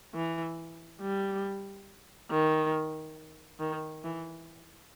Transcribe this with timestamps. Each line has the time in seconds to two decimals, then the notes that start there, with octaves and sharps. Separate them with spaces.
0.14 E3
1.01 G3
2.31 D#3
3.60 D#3
4.04 E3